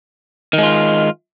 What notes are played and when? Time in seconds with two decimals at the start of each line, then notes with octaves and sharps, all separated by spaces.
0.53 D#3
0.58 G#3
0.63 F4